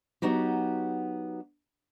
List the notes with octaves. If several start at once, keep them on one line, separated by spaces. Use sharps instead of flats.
F#3 B3 D#4 F#4 G4